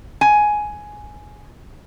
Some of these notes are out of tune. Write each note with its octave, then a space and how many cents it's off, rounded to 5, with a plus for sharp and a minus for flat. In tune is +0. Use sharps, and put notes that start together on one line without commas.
G#5 +10